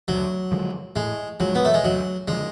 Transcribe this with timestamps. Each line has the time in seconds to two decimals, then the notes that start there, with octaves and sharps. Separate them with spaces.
0.08 D2 F#3
0.52 D3 F3 G#3
0.96 A2 G#3
1.40 F3 F#3 G#3
1.55 B3
1.65 A3
1.74 G#3
1.84 D2 F#3
2.28 D3 F3 G#3